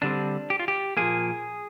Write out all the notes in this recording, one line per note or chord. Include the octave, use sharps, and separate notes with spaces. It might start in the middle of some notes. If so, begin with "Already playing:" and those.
D3 G3 C4 D4
G4
F4
G4
A#2 F3 A#3 G#4